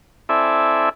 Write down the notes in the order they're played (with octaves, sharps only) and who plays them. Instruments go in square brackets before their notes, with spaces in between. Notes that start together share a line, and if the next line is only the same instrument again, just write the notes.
[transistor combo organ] C4 E4 A4 D5 E5 G#5